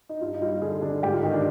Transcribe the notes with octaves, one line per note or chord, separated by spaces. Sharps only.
D#4
G2 F4
D#4
G3 F4
D3 G#4
D3 D4
G#2 G4
F4
D#3 D#4
D4